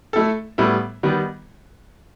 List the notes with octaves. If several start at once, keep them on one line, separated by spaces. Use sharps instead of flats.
A3 E4 A4
A2 G3 B3 E4
D#3 G3 B3